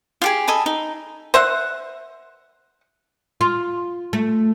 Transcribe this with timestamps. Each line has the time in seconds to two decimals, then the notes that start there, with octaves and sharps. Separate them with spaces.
0.21 F4 G4 G#4
0.47 A4 D#5 G#5 B5
0.66 D#4
1.34 C5 E5 F#5
3.41 F4
4.13 A3